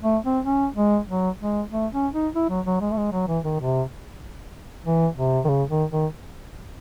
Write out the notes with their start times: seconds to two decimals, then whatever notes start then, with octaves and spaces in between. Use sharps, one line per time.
0.03 A3
0.25 C4
0.45 C#4
0.76 G#3
1.08 F#3
1.40 G#3
1.72 A3
1.93 C#4
2.13 D#4
2.35 E4
2.49 F#3
2.66 F#3
2.81 G#3
2.92 A3
2.97 G#3
3.12 F#3
3.28 E3
3.45 D#3
3.60 C3
4.85 E3
5.17 C3
5.45 D#3
5.49 C#3
5.70 D#3
5.92 D#3